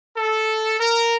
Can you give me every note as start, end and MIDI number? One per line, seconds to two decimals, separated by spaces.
0.16 0.77 69
0.79 1.16 70